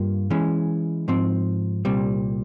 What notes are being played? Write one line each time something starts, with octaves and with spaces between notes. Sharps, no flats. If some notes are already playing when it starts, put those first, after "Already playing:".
Already playing: G2 G3 A#3 F4
E3 G#3 C#4
G#2 F3 C4
C2 A#2 G3 C4